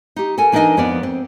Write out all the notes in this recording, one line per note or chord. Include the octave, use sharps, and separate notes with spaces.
D#4 G4
A4 A#4 G#5
E3 D4 D#4 A#4 D#5 G#5
F2 B3 A#4 D5
C4